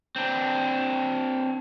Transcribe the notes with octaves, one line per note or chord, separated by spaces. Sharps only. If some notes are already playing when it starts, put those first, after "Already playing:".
C4 D4